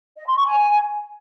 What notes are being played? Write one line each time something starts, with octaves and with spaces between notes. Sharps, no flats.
D#5
C6
C#6
G#5